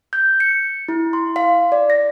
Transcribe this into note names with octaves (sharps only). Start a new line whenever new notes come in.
G6
C#7
E4
C6
F5
D5
A#6